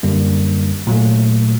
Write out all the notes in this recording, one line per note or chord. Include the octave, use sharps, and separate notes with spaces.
F#2 D3 G3 A#3
A#2 F#3 A3